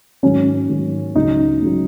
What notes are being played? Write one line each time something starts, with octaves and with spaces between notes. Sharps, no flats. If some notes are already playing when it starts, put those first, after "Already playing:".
G#2 D#3 F#3 C#4
G#2 D#3 F#3
C#2 C#3 F#3 D#4
C#2 C#3 F#3